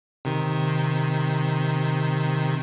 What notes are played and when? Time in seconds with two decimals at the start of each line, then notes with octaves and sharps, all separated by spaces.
0.25 C3 D#3